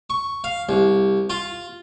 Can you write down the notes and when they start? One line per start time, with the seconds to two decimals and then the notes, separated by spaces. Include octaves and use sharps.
0.10 C#6
0.44 F5
0.69 C2
1.30 F4